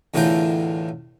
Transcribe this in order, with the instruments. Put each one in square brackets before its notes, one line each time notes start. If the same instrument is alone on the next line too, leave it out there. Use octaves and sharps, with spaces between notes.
[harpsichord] E2 A2 D3 F4 A#4 G5